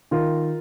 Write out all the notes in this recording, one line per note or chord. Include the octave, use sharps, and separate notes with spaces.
D#3 F4 A#4